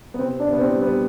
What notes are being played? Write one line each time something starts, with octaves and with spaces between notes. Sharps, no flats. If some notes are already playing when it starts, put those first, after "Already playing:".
B3
C3 C4
D4
C3
B3
C4
G3
B3